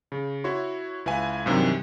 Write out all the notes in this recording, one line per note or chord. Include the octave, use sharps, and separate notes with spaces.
C#3
E4 F#4 C#5 C6
C#2 E4 B4 F5 G#5
G2 C3 D#3 E3 F#3